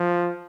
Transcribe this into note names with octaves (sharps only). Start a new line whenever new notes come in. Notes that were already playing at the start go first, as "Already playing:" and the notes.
Already playing: F3